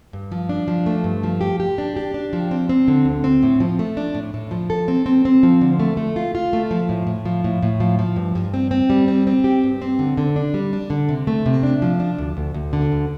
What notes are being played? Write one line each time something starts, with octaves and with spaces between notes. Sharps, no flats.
G2
F3
D4
F3
A3
G2
F3
G4
G4
D4
G4
D4
F3
C4
C4
D3
D2
C4
A2
F3
A3
D4
A2
A2
F3
A4
C4
C4
C4
F3
D3
A3
A3
F4
F4
A3
F3
A2
A2
F3
A2
A2
F3
F3
G2
G2
C4
C4
G3
C4
C4
G4
G2
C4
D3
D3
D4
G3
D4
D3
C3
A3
C3
D4
F3
D4
D2
D2
D2
D3
D2